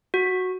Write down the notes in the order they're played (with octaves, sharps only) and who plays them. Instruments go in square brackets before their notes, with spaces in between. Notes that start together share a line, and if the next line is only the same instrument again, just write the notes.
[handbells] F#4